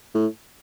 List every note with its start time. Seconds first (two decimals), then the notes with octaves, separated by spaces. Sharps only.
0.15 A2